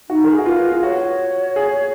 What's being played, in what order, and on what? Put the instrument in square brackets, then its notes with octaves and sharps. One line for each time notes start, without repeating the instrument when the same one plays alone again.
[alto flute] D#4 [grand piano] F#4
[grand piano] A#4
G#4
F#4
[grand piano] F4 [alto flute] B4
[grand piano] F4
[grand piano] F#4 [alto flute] C#5
[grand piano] G#4